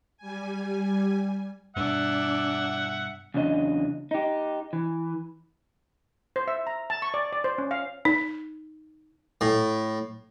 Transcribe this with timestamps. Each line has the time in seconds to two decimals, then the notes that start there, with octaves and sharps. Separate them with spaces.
0.17 G3 G#5
1.76 G2 B2 D4 E5 F#5
3.34 E2 C#3 F#3 D4 D#5
4.11 D#4 G4
4.73 E3
6.36 C5
6.48 E5
6.67 A#5
6.90 A5
7.02 C#6
7.14 D5
7.33 D5
7.44 C5
7.58 C#4
7.71 F5
8.05 D#4
9.41 A2